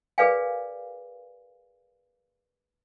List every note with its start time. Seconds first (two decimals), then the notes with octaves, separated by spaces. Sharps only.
0.18 G#4 A#4 B4 D5 F5 G#5